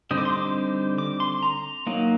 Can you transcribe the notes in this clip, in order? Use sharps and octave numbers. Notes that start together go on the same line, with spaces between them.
D3 G3 C4 D#4 D#6
D6
C6
D6
D6
C6
A#5
F#3 A#3 D#4